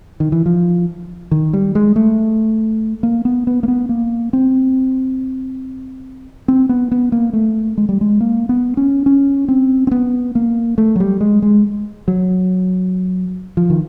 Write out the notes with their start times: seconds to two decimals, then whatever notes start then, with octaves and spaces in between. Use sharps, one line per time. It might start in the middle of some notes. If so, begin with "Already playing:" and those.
0.20 D#3
0.32 E3
0.46 F3
1.31 D#3
1.53 G3
1.75 G#3
1.96 A3
3.03 A#3
3.25 B3
3.47 B3
3.63 A#3
3.68 B3
3.89 A#3
4.33 C4
6.48 C4
6.69 B3
6.91 B3
7.12 A#3
7.33 A3
7.78 G#3
7.89 G3
8.01 G#3
8.21 A#3
8.49 B3
8.77 C#4
9.06 C#4
9.48 C4
9.87 C4
9.91 B3
10.35 A#3
10.78 A3
10.96 F#3
11.00 G3
11.21 G#3
11.42 G#3
12.08 F#3
13.57 F3
13.70 D#3